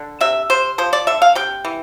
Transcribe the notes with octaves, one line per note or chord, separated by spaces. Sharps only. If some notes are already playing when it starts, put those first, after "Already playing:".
Already playing: D3
C3 E5
C3 C5
F3 C5
D5
D3 E5
F5
C3 G5
E3